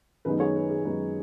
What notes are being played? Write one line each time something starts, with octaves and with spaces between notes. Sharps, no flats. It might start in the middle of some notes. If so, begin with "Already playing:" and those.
F#2 D#3 G#3 B3 D#4 B4
G#4 C#5
B4
G#4
F#2 D#3 G#3 B3 D#4 B4